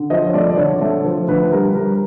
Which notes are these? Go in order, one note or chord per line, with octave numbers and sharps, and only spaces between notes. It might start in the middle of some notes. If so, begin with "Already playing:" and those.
Already playing: D3
F3 D#5
C#5
A3 D5
D5
D3 C#5
A3
F3
D3 B4
G3 A#4
G3 A#4